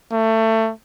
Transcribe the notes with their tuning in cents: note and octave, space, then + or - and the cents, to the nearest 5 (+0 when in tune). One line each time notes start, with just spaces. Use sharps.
A3 +20